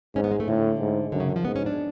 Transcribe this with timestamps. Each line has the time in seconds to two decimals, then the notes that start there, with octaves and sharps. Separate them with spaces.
0.15 G#2 C#4
0.24 B3
0.32 G#3
0.40 A3
0.48 A2 D3
0.80 G#2
1.12 F#2 D3
1.20 C#3
1.29 D3
1.36 F3
1.45 G#2 B3
1.56 C#4
1.66 D4